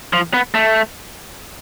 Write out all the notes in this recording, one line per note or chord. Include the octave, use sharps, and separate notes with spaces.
F3
B3
A3